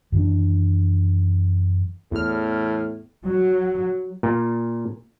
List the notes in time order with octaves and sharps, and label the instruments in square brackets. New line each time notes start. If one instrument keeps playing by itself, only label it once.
[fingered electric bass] F#2 D#3 E3 D4
[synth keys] E2 F6 [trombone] A2
[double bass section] F#3
[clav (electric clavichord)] A#2